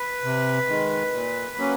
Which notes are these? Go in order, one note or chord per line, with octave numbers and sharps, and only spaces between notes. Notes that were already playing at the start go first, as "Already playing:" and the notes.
Already playing: B4
C3
D#3 G#3
A#2
F#3 A#3 C#4